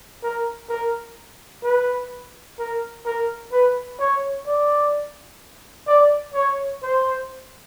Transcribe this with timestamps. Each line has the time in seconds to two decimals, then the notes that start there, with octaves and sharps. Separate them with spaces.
0.23 A#4
0.69 A#4
1.64 B4
2.59 A#4
3.06 A#4
3.52 B4
4.00 C#5
4.46 D5
5.88 D5
6.34 C#5
6.82 C5